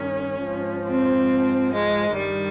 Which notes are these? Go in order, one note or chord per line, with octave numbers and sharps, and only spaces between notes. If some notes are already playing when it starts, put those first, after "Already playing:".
Already playing: G2 D#3 C#4
G#2 F3
C4
G#3
G2 D#3 G3